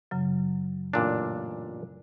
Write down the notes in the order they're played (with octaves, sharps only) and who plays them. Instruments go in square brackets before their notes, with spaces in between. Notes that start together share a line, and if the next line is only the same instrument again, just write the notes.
[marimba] F#2 C#3 F#3
[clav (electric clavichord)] A1 A#2 D4